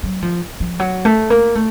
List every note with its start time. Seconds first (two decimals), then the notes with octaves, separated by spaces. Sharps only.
0.03 F#3
0.22 F3
0.60 F3
0.79 F#3
1.05 A3
1.30 A#3
1.55 A3